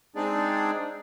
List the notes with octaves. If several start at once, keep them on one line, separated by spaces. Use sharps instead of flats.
G#3 C4 D4 D#4 G#4 D5